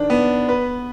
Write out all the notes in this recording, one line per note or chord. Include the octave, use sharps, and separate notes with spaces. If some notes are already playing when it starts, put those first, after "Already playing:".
Already playing: D#3 D4
B3
B4